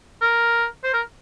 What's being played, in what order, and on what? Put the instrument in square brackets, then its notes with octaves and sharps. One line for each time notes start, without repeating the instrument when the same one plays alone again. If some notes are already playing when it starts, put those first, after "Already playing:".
[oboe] A#4
C5
A#4